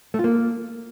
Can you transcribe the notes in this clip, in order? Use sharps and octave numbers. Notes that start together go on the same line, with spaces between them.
A3
F4
A#3